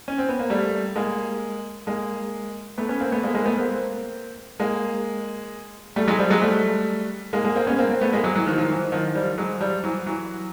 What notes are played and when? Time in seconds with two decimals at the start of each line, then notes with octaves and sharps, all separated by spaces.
0.08 C#4
0.18 C4
0.29 B3
0.39 A#3
0.50 G3 A3
0.96 G#3 A#3
1.87 G#3 A#3
2.78 A3 B3
2.89 B3 C#4
3.00 A#3 C4
3.12 A3 B3
3.23 G#3 A#3
3.35 G#3 A#3
3.46 A3 B3
3.57 A#3 C4
4.60 G#3 A#3
5.96 G3 A3
6.08 F#3 G#3
6.19 F3 G3
6.30 F#3 G#3
6.42 G3 A3
7.33 G#3 A#3
7.44 G#3 A#3
7.55 A#3 C4
7.67 B3 C#4
7.79 A#3 C4
7.90 A#3 C4
8.01 A3 B3
8.12 G#3 A#3
8.24 F#3 G#3
8.35 E3 F#3
8.47 D#3 F3
8.58 D#3 F3
8.69 E3 F#3
8.92 D#3 F3
9.15 F3 G3
9.38 F#3 G#3
9.61 F3 G3
9.83 E3 F#3
10.06 E3 F#3